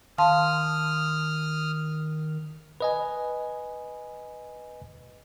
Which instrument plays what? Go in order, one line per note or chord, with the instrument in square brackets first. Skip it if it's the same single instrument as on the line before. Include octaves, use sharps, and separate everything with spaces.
[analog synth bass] D#3 [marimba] F5 A5 C6 [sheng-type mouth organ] D#6 F6
[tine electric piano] B4 D#5 G#5